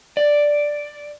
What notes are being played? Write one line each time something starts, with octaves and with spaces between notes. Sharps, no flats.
D5